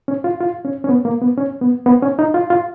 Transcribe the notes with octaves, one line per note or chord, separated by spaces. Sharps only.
C#4
F4
F4
C#4
C#4
B3
A#3
B3
C#4
B3
B3
C#4
D#4
F4
F4